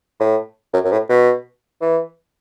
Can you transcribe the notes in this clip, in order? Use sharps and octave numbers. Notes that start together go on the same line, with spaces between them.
A2
F#2
F#2
A2
B2
E3